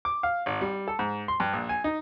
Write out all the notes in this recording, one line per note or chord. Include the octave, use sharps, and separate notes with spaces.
D6
F5
G#1
G3
A4
G#2
C6
G2
A#1
G#5
D#4